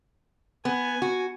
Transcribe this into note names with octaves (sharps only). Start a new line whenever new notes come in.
B3 G#5
F#4